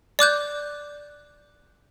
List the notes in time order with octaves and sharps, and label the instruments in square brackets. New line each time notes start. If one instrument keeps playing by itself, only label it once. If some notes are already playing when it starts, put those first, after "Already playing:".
[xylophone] D5 D6 F#6 G6